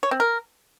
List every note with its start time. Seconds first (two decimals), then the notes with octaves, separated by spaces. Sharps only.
0.03 C#5
0.11 C4
0.20 A#4